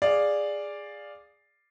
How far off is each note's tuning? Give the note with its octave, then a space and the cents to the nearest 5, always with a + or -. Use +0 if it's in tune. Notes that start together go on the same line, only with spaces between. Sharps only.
G#4 -10 D5 +0 F5 +0